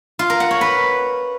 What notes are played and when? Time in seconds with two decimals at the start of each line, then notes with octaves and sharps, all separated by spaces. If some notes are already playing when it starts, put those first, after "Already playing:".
0.19 F4
0.30 A#4
0.40 F#5
0.51 C#5
0.61 B4